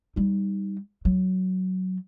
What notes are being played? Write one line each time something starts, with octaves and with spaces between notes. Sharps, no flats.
G3 D#4
F#3